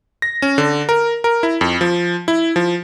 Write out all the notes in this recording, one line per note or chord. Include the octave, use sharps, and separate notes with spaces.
A#6
C#4
D3
A#4
A#4
E4
F2
F3
E4
F3